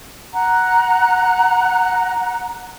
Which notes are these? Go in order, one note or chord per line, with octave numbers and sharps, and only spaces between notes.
F#5 A#5